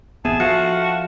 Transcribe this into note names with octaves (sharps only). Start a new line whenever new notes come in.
A1 B3 G#4 E5 A5
F3 F#4 A4 E5 F5